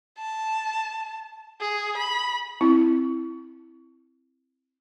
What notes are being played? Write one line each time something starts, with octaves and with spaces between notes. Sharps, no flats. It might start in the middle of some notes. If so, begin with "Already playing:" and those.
A5
G#4
B5
C4 E4